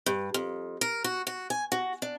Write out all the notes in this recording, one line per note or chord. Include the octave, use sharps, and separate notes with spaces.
G2
F2
A#4
F#4
F#4
G#5
F#4
D4